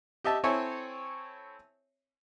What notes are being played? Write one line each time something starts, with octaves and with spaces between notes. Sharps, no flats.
G4 D#5 E5 A5
C4 E4 A4 C#5 E5 G#5